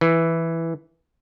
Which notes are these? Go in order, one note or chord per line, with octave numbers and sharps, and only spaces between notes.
E3